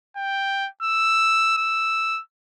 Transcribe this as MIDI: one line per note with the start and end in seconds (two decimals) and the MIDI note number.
0.17 0.68 79
0.83 1.57 88
1.57 2.21 88